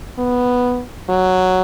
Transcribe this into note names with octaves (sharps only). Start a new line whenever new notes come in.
B3
F#3